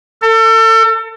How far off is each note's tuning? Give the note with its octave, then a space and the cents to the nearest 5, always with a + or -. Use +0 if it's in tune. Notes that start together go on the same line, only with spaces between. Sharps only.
A4 +35